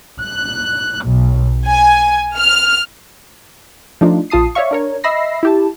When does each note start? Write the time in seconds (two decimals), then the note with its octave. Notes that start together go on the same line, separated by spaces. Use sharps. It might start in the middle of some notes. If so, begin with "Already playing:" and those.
0.22 F#6
1.06 B1
1.66 G#5
2.37 F6
4.01 F3 A3 D4 D#4 F4
4.30 A#1 F4 A5 D#6 C7
4.55 C#5 D5 E5 F5 C#6
4.71 D4 A#4 C#5
5.04 D#5 E5 B5 E6 A#6 C7
5.43 E4 G4 A5